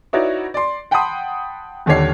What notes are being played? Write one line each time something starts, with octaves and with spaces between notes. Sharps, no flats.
D#4 E4 F#4 B4 C#5 D5
D5 C6
F#5 G5 A5 B5 C6 D#6
D#1 D#2 D3 G4 C#5 C7